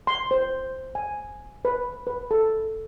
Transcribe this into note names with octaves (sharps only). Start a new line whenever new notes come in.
C6
C5
G#5
B4
B4
A4